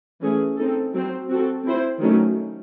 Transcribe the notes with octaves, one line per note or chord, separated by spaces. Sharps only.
E3 A3 C#4 G#4
C4 D#4 A4
F#3 C4 F#4 C5
C4 F#4 A4
C4 E4 C5
D#3 F#3 A3 C#4